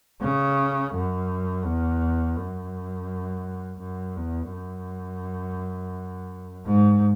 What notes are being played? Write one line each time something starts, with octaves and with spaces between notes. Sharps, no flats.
C#3
F#2
E2
F#2
F#2
E2
F#2
G#2